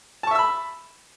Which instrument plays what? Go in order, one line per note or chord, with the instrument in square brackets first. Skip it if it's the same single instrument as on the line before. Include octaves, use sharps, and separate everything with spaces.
[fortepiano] A5
C#6
E5
E6
B5